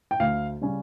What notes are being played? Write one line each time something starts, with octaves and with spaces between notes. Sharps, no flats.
G5
D2 F5
C#3 G3 C#4